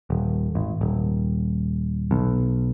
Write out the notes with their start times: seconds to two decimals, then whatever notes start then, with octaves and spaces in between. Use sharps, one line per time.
0.10 D#1
0.55 G#1
0.81 D#1
2.11 B1